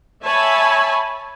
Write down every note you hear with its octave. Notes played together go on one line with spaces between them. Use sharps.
C#5 E5 G#5 A5 B5